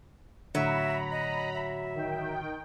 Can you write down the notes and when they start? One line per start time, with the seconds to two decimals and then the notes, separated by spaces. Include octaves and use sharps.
0.55 A2 D3 F#3 E5 A#5 B5
1.11 D#5
1.54 E5
1.95 D#3 G5